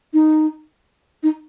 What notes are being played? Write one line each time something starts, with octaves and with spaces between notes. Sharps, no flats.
D#4
D#4